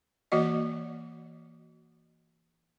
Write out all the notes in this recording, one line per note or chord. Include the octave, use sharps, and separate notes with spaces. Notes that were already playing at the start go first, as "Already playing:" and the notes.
E3 A#3 F#4 D5 D#5